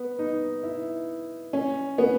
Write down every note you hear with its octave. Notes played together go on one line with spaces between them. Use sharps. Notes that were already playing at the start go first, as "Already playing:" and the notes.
Already playing: B3
D#4
E4
C#4
B3